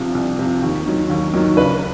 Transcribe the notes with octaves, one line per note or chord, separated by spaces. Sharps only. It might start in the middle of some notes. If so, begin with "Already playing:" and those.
Already playing: C2 C3 F3
C2
C3 F3
D#2
D#3 F#3
D#2
D#3 F#3
C#2 B4